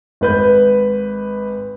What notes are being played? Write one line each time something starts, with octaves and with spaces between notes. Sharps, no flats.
G#1 B4 G6